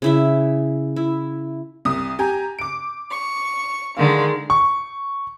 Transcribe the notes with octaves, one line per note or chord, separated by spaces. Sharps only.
C#3 E4 E5
E4
C2 D#6
G4 G#5 A#5
D6 D7
C#6
D3 D#3 G#3 F5
C#6